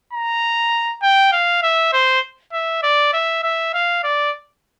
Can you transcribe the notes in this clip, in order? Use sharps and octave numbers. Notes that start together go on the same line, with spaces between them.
A#5
G5
F5
E5
C5
E5
D5
E5
E5
F5
D5